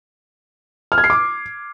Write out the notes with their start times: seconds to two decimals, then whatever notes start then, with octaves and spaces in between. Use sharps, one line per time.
0.92 F6
0.98 G#6
1.04 C7
1.10 D6